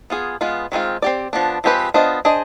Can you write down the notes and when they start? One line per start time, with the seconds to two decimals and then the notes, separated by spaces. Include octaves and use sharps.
0.10 B3 F4 G#4
0.41 G#3 B3 F4
0.72 D#3 G#3 C4 F4
1.02 C4 G4 D5
1.33 F3 B3 D4
1.64 F3 G#3 C4 G4 B4
1.94 B3 D4 F4 C5 D#5
2.25 D4 G#4 C5 D#5